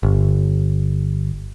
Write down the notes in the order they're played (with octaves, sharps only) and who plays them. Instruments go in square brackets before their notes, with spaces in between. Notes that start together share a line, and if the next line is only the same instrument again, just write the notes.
[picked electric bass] G1